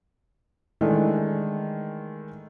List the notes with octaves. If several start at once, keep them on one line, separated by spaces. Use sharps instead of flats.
D#3 E3 G#3 A3 D4